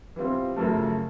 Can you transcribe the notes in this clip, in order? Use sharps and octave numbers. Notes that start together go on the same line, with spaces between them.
E3 G3 C4 F4
F#2 C#3 F3 A3